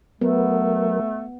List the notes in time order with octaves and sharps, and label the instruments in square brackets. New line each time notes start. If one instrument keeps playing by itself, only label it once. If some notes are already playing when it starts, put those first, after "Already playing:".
[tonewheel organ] F#3 A#4 [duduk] A3 [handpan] B3